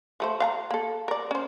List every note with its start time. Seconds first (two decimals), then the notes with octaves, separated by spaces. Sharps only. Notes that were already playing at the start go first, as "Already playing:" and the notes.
0.20 F3 A3 C5
0.40 F5 G5 A#5
0.71 A#3 A4
1.08 A#4 D5
1.31 C#4 C5